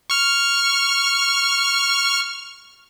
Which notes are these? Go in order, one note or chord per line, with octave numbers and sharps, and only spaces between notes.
C#6 F6